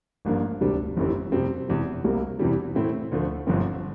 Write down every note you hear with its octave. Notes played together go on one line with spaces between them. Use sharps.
A1 G2 F3 A#3 D4
E1 D2 C3 G3 D4
G1 F2 E3 G3 C4
F2 C3 G3 C4
E1 E2 C3
C2 C3 G3 A#3
E2 C3 E3 G3
A2 E3 A3 C4 E4
D2 D3 F3 A3
G1 G2 D3 F3 C4